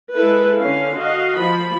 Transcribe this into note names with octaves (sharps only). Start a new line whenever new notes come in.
G#3 E4 A4 B4
D3 C#4 F5
F#4 D#5 F5
F3 B5